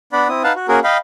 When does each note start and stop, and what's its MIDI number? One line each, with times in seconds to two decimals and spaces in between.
0.13 0.28 59
0.13 0.28 62
0.13 0.28 74
0.13 0.28 78
0.13 0.28 83
0.29 0.43 60
0.29 0.43 64
0.29 0.43 87
0.44 0.53 63
0.44 0.53 71
0.44 0.53 77
0.44 0.53 78
0.44 0.53 81
0.56 0.67 66
0.68 0.79 58
0.68 0.79 61
0.68 0.79 66
0.68 0.79 68
0.68 0.79 70
0.84 0.97 75
0.84 0.97 77
0.84 0.97 79
0.84 0.97 83